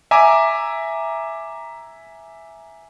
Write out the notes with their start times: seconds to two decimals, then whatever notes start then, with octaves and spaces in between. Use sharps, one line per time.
0.11 E5 G#5 A#5 D6